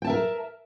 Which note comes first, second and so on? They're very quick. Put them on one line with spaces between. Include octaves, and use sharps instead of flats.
G5 A5 E5 A#4